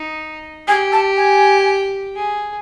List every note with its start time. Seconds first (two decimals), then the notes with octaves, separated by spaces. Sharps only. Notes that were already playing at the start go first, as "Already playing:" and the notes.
Already playing: D#4
0.67 G4 G#5
0.92 A5
1.17 G#5
2.16 G#4